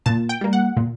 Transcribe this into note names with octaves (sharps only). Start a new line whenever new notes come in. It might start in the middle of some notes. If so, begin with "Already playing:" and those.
A#2 A5
G5
G3 A#3
F#5
A#2